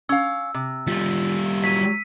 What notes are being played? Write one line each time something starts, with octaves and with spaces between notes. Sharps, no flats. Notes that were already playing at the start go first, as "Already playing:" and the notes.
C#4 F5 E6
C3
G3 F4
F#3 B6 D#7